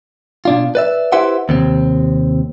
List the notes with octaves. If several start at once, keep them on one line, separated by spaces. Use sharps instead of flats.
B2 D4 F4
B4 D5 E5
E4 G4 B4 C5 E5 F#5
D#2 C3 C4